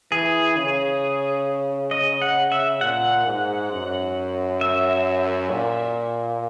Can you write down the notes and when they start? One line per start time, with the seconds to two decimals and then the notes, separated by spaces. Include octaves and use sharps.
0.11 E3 G#4
0.57 C#3
1.91 D#5
2.22 F#5
2.52 E5
2.81 A#2 F#5
3.27 G#2
3.72 F#2
4.61 E5
5.51 A#2